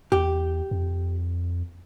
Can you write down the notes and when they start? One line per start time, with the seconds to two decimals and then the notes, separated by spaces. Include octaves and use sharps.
0.12 E2 G4
0.71 F2